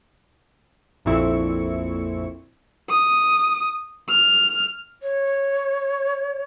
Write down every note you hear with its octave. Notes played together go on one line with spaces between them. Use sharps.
A#1 F2 A#2 C4 E4 C#6
D#6
F6
C#5